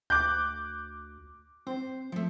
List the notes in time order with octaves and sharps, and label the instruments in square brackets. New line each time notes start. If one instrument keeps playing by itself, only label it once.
[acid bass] D2 [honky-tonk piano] D6 F#6 G6
[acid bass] C4 [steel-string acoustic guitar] C5
[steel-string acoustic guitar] F3 A3